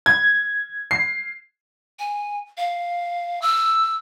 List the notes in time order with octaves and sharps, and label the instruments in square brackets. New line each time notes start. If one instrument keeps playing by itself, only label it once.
[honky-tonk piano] G#6
C7
[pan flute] G#5
F5
E6